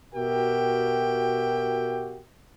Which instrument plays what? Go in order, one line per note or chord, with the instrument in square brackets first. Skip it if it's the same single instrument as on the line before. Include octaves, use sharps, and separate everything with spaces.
[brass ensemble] B2 F#4 G4 A#4 E5 G5